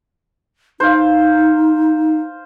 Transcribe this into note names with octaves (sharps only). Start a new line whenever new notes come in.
D#4 C5 F5